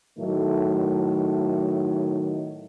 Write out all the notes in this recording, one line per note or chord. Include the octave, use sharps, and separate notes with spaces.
A2 D#3 F#3 A3